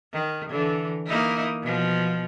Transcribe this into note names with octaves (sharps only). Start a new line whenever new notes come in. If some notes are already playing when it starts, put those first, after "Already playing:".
D#3
D3 E3
A#3 D#4 E4
B2 F3